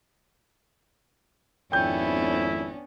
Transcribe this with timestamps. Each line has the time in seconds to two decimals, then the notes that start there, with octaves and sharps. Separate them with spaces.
1.72 G#1 F2 B3 C#4 D4 E4 G5 G6